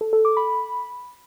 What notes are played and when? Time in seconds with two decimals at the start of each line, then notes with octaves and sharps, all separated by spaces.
0.01 A4
0.13 A4
0.25 D6
0.37 B5